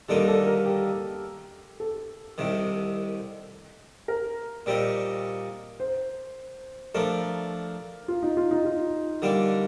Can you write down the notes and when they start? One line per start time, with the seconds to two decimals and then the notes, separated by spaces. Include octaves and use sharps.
0.09 D#2 D3 G3 A#3 D#4 A4
0.28 A4
0.47 A#4
0.66 G4
1.80 A4
2.38 C2 C3 D#3
4.08 A#4
4.66 A#2 G3 C4 D#4
5.80 C5
6.94 F3 A3 D4 A#4
8.08 F4
8.23 D#4
8.37 F4
8.51 D#4
8.65 F4
9.22 D3 G3 A#3 D4